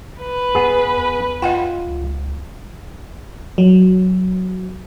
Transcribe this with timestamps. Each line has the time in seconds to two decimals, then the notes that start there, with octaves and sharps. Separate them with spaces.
0.19 B4
0.55 E2 B3 G#4
0.97 E2
1.42 F4 D#5 F#5 G5
1.87 C#2
3.58 F#3